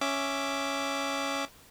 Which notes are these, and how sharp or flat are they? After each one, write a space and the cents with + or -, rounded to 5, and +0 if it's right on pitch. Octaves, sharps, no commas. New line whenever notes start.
C#4 +0 E5 +0 D6 +0